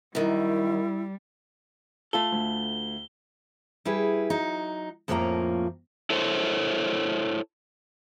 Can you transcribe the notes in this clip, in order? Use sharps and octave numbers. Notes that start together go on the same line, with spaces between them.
F#2 D#3 G3 E4
A3 F4 A4 G7
D2
G3 E4 G#4 B4
F#3 D#4
F2 A2 F3 A#3 C#4 A#5
E4 A4 C5 C#5